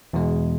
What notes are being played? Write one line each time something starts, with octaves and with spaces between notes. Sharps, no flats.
E2 B2 G#3